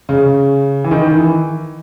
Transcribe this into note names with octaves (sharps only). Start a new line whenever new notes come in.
C#3
E3
D#3
E3